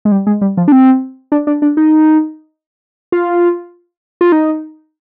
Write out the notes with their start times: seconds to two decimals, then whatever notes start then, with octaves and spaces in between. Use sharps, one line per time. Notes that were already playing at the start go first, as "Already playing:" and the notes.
0.05 G#3
0.12 G3
0.27 G#3
0.41 G3
0.57 F3
0.68 D4
0.72 C4
1.32 D4
1.47 D4
1.62 D4
1.77 D#4
3.12 F4
4.21 F4
4.32 D#4